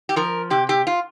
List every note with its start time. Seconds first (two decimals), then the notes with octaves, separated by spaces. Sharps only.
0.09 G4
0.16 F3 A#4
0.50 C3 G4
0.69 G4
0.87 F4